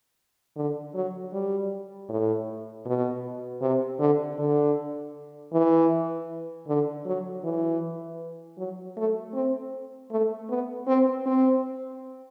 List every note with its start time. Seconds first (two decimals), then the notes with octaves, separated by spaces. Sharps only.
0.56 D3
0.95 F#3
1.33 G3
2.09 A2
2.86 B2
3.61 C3
3.99 D3
4.39 D3
5.53 E3
6.68 D3
7.06 F#3
7.44 E3
8.58 F#3
8.97 A3
9.34 C4
10.11 A3
10.49 B3
10.87 C4
11.26 C4